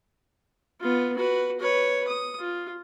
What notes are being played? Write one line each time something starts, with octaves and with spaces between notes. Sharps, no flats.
B3 F4
F#4 B4
B4 C#5
D#6
F4